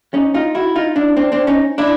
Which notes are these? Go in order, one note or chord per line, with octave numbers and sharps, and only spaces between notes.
C#4 D#4
D#4 F4
E4 F#4
D#4 F4
D4 E4
C4 D4
C4 D4
C#4 D#4
D4 E4